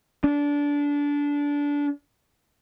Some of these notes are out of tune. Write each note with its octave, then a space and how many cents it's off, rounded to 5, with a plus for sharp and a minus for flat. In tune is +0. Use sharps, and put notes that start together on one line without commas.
D4 -20